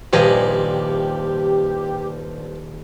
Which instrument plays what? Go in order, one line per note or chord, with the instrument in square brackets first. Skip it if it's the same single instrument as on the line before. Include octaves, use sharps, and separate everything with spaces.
[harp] D#1 G#4 A#6 [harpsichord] G2 F3 [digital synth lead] G4